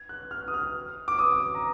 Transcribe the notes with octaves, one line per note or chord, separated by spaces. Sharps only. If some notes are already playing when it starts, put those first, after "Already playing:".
Already playing: G#6
F#6
F6
D#6
F6
D6
D#6
A#5